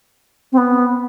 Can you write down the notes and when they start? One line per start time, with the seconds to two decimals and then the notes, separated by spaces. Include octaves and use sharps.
0.52 C4
0.57 B3